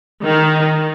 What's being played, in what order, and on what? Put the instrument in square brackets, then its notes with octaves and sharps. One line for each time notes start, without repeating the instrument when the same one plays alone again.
[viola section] D#3